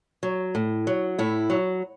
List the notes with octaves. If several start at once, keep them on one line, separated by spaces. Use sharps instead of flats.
F#3
A2
F#3
A2 E4
F#3